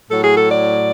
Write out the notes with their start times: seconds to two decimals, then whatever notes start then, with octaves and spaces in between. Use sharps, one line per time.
0.08 A2 F#3 A4
0.23 G#4
0.36 A4
0.50 D5